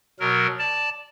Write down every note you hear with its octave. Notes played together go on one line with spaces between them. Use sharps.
B2 F#3 A#4
D5 A5